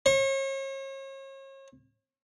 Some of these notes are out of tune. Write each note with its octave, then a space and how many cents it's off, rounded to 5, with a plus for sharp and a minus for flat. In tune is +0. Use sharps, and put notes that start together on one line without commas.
C#5 -40